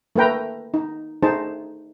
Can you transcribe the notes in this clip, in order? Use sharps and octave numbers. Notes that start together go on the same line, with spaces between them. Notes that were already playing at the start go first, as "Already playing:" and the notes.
A3 A#3 B4 G5 A#5
D#4
A3 D#4 G#4 C5 A5